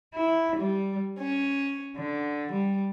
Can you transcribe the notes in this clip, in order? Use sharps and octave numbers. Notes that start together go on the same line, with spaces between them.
E4
G3
C#4
D3
G3